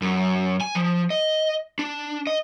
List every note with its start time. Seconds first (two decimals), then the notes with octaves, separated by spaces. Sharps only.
0.02 F#2
0.61 G#5
0.75 F3
1.10 D#5
1.79 D4
2.27 D#5